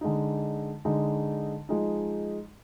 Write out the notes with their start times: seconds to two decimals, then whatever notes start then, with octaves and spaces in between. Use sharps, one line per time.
0.01 D3 G#3 D#4
0.85 D3 G#3 D#4
1.69 F3 G#3 D#4